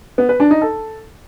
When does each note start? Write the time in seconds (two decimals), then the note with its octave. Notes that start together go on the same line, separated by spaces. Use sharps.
0.18 B3
0.29 B4
0.40 D4
0.51 D#4
0.62 A4